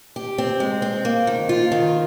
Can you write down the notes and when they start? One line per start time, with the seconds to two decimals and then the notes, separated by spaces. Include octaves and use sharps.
0.16 G4
0.38 C4
0.60 G#3
0.82 C4
1.05 A#3
1.27 D#3
1.49 F4
1.72 D#3